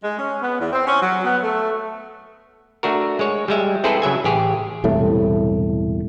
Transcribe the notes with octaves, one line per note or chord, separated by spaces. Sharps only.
G#3
C#4
B3
E2
C4
C#4
F#3
B3
A3
A3 D4 F#4 A#4
G#3 C#5
G3 G#3 E5
C4 E4 G#4 A4 B4 C5
C#3 F#3 E5 G#5
A1 G4 G#4
E1 C2 A2 A3